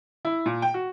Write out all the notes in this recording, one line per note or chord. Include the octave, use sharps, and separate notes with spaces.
E4
A#2
G5
F#4